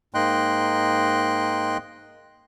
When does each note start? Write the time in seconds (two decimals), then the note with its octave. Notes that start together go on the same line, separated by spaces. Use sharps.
0.14 G#2 A#3 D#5 G5 C6 F#6